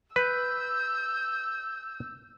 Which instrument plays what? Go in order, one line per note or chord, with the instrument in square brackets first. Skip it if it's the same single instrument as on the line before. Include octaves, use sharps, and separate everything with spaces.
[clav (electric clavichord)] B4 [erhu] E6 [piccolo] G6